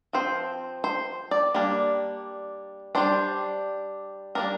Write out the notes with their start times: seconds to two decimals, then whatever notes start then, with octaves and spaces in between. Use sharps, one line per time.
0.13 F3 C4 C5
0.84 C5
1.31 D5
1.54 G3 A#3 D4
2.95 G3 D4 C5
4.35 G3 A#3 D4 A#4